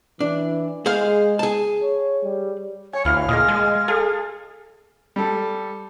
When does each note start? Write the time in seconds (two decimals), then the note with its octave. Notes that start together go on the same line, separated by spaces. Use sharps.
0.21 E3 D4
0.86 G#3 G#4 C5 F5
1.39 G#4 A5
1.83 C#5
2.23 G3
2.93 C#5 G#5
3.05 D2 E4 F5 F6
3.29 A#2 G#3 D#5 D#6
3.48 G#3 G#5
3.88 G#4 A4 F5
5.16 G3 A4